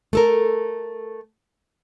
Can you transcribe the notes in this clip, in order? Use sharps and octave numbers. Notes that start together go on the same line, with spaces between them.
A3 A4 A#4